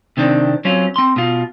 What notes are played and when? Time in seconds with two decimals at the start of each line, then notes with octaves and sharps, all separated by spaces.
0.17 C3 D#3 C4 D4
0.65 F#3 C4 C#4 F4
0.96 C4 C6
1.16 B2 F4